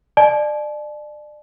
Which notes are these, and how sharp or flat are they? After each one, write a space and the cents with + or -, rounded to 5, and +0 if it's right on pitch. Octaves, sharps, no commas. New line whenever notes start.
D5 +30 A5 -45